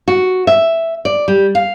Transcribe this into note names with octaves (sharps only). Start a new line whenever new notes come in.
F#4
E5
D5
G3
F5